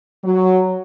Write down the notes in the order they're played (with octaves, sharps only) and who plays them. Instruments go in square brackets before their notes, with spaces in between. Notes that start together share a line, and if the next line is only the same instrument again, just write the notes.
[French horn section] F#3